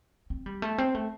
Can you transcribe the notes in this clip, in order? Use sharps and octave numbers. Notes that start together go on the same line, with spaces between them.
C4
G3
A3
C4
A3